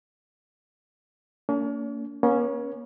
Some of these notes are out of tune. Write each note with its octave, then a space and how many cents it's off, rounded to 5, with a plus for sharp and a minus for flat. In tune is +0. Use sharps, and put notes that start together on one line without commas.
A#3 -30 C#4 +45
A#3 +45 C#4 +0